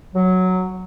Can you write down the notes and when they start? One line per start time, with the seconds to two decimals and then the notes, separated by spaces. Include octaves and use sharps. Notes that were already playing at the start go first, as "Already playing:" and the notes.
0.15 F#3